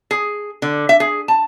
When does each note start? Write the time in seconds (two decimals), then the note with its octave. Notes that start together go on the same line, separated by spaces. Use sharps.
0.11 G#4
0.62 D3
0.89 E5
1.00 G#4
1.28 A5